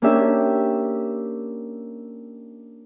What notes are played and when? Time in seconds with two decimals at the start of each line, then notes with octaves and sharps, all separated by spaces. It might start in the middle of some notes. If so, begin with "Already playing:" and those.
0.02 A#3 C#4 D4 G4 E5